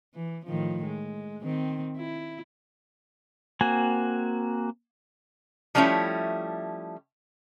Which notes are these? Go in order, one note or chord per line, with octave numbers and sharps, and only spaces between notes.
E3
A2 D#3 F3
G#3
D#3 C4
E4
A#3 C4 F#4 G#5
F3 G3 A3 C#4 E4